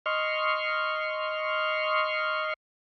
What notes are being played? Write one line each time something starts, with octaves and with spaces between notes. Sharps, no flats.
D#5 C6 C#6 F6